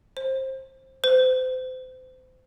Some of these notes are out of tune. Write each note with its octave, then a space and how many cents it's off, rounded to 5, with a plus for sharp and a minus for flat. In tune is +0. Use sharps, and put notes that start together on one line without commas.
C5 +20
C5 -30